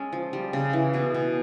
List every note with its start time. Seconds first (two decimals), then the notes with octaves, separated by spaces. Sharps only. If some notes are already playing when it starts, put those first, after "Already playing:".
Already playing: G#3 C#4 A4
0.13 F3
0.33 G3
0.53 C#3
0.73 E3
0.94 B2 G#4
1.14 B2